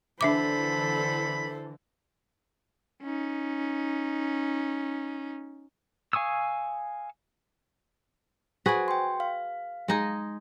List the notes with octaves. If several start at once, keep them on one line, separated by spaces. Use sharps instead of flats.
D3 E3 D4 A4 C5 E5 B5 D6
C#4 D#4
F5 G#5 C#6 D#6 E6
F#4 G#4 B4 C5 G#5
G5 C6
F5
G#3 D#4 G#4